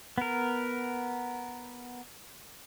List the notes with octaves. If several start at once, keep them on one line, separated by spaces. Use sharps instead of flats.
B3 A#4